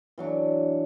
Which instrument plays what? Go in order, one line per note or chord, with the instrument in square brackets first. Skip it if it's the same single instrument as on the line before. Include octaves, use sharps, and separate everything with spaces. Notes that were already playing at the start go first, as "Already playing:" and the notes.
[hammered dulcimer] E3 F#3 D4